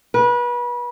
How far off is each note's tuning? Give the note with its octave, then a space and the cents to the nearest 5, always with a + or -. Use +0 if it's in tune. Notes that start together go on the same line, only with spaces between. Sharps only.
B4 -30